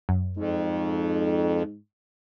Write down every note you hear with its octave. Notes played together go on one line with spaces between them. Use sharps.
F#2
F2 G#2